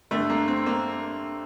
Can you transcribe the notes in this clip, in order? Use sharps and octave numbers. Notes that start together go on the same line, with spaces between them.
G2 D3 A3
A#3
C4
A#3